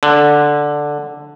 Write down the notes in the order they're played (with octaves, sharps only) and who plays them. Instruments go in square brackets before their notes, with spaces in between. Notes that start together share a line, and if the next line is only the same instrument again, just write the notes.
[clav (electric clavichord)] D3